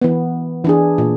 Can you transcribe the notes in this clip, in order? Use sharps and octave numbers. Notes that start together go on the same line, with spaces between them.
E3 B3
E3 D4 G#4
A#2